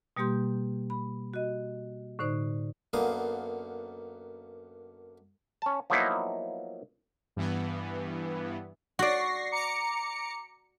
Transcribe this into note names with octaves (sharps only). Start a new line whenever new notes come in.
B2 G3 A#3 G4 C6 G6
B5
F#4 D#5
A2 D3 D#4 C5 D5
F#2 D3 A#3 B3 F5 D#6
C#4 A5
F3 F#3 A#3 B3 D#4 E4
G2 E3 B3
F#4 D5 C#6 A#6 C7
A#5 D6 C#7